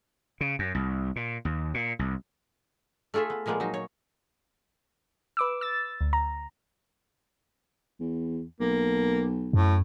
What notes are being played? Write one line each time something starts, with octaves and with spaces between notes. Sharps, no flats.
C#3
F#2
C2
A#2
D#2
A#2
C2
A3 F4 G#4 A4 E5
B3
A#2 F3 G#3 A#3 B3
F#3 D#4
C#5
B4 D6 E6
E6 A6
D2
A#5
E2
B1 A#3
F#2 A2